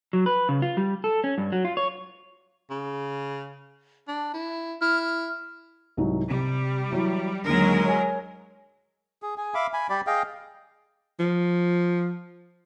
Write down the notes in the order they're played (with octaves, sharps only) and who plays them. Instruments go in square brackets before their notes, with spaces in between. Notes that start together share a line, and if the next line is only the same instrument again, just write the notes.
[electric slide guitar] F#3
B4
C#3
F4
G3
A4
C#4
G2
F#3
F4
C#5
[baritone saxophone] C#3
D4
E4
[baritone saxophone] E4 [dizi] F6
[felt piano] C2 G#2 F#3
[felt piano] C3 [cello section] G3
[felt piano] E3 F#3 E4
[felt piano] D#2 D3 [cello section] F#3 G#3 A#4
[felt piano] C#5 G#5
[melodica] G#4
G#4 G#5
E5 F5 B5 D6
G#5 B5
G3 G4 D5 B5
G#4 D#5 F5 G5
[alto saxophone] F3